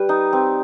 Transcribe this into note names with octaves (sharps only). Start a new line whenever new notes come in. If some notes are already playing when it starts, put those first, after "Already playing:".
Already playing: G3 B4
D#4
C4